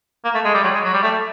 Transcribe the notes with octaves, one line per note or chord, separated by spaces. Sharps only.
A#3
A3
G#3
G3
F#3
G#3
F#3
G3
A3